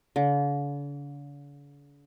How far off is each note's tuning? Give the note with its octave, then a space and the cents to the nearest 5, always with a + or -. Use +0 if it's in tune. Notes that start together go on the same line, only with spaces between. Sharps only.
D3 -45